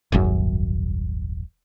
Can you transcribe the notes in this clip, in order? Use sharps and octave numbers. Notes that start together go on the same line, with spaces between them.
D#1 G#1 F#2